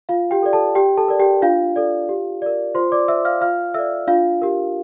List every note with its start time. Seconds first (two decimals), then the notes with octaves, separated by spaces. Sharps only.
0.09 F4 F5
0.31 G4 G5
0.43 A4
0.46 D5
0.53 A4 A5
0.75 G4 G5
0.97 A4 A5
1.08 A#4 D5
1.20 G4 G5
1.42 D4 F4 F5
1.76 A4 D5
2.09 G4
2.42 A#4 D5
2.75 F4 C5 C6
2.92 D5 D6
3.08 C5 E5 E6
3.25 F5 F6
3.41 F4 F5 F6
3.74 A4 D5 E5 E6
4.07 D4 F4 F5
4.42 G4 A#4